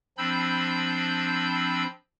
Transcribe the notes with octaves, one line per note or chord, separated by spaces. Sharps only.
F3 C4 D4 B5 E6 G6